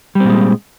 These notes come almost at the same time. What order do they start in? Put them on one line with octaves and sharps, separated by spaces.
G3 C4 A#2 G#3